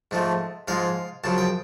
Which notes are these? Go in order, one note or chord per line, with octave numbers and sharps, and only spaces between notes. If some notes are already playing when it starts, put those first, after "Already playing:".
G#2 F3 A3
G#2 F3 G#3 F5
F#2 C#3 F3 A5
G5